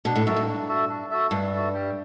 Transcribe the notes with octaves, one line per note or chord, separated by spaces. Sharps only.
B2 D4
A2
F#2 F#4 A4 E5
G2
D4
F#4 A4 E5
D4
F#4 A4 E5
G2 D4
F#4 A4 E5
G3